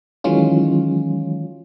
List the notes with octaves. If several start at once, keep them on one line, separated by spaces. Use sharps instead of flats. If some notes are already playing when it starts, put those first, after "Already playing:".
D#3 E3 F#3 G#3 C#4 F4